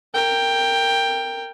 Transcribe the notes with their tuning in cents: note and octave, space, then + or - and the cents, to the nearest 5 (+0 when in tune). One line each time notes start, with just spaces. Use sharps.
A#4 -15 G5 +10